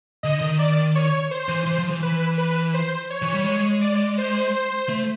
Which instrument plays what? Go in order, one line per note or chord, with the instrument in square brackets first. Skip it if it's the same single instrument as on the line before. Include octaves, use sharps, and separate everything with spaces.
[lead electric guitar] D3 [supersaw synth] D#5
[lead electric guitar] D#3
[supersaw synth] D5
C#5
C5
[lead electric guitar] E3
E3
F3
E3
[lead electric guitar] E3 [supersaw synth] B4
[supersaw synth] B4
C5
C#5
[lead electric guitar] E3
G3
G#3
[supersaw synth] D5
C5
[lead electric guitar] A3